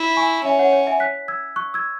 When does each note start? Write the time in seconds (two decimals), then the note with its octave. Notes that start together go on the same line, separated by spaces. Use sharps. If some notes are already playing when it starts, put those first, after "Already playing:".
Already playing: E4
0.17 G#5 C#6
0.44 C#4 E5 G#5
0.59 C#5 F#5
0.73 C#5
0.87 E5 G#5
1.00 F#6 B6
1.28 E6 G#6
1.56 C#6 F#6
1.74 E6 G#6